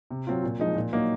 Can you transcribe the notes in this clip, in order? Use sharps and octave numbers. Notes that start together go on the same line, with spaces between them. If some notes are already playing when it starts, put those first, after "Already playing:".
C3
F#3 C4 F4
A#2
F3 G#3 D#4
A#2
F#3 A#3 D#4